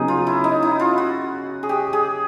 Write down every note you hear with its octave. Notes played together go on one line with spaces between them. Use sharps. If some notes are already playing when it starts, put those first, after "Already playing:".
Already playing: C#3 F#3 B3 D#4 G#4
F4
E4
D#4
E4
F4
F#4
G#4
G4
G#4